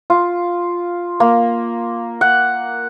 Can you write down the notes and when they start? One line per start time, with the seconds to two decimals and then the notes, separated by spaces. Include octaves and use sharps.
0.10 F4
1.20 A#3
2.21 F#5